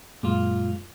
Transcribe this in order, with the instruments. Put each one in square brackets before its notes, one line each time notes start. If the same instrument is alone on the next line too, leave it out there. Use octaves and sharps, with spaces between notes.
[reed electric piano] F#2 G#3 [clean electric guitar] A#2 F4